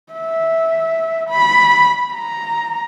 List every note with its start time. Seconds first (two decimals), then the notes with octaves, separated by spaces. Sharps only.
0.13 E5
1.29 B5
2.14 A#5